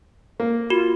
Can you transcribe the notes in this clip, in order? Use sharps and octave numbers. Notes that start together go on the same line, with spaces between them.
A#3
F4 F#4